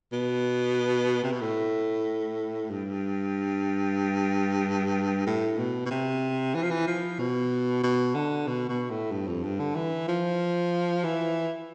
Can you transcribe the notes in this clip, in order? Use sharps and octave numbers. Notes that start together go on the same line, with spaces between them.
B2
C3
B2
A2
G2
A2
B2
B2
C3
E3
F3
E3
F3
B2
B2
D3
B2
B2
A2
G2
F2
G2
D3
E3
F3
E3